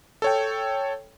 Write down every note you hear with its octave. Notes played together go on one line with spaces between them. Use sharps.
A4 C#5 G5